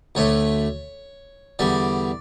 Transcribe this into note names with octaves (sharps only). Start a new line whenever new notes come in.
D2 D3 A3 C#5
E2 D3 G3 D5